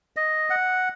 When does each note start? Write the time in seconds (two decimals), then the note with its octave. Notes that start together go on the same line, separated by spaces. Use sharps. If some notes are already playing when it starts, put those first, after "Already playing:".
0.17 D#5
0.50 F#5